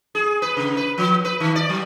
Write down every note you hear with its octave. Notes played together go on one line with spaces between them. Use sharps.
G#4
B4
C#3
B4
F3
B4
D#3
D5
F#3